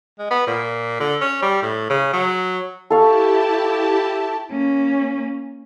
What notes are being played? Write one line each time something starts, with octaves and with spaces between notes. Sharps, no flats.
G#3
B3
A#2
D3
C#4
G3
A2
C#3
F#3
E4 G4 A4 F5 A5 C#6
A#3 C#4